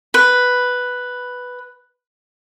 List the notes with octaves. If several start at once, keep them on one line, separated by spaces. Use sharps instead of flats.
B4 B5